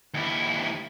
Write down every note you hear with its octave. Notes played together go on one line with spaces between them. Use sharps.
D#2 E4